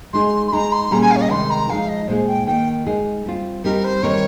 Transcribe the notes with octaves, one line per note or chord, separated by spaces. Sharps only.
G#3 D#4 G#4 C6
C6
G#3 D#4 G#4 A#5
C6
A#2 G3 A#3 C#4 G#4 A#5
G#5
F5
C#5
D#5
C3 D#3 G#3 D#4 C6
A#5
F3 G#3 D#4 F5
D#5
A#2 G#3 D#4 G#4 C5
G5
D#3 A#3 D#4 G5
G#3 D#4 G#4
G3 C4 F4
G3 C4 D#4 G4 A#4
C5
D#3 G3 C4 D#4 A#4 C#5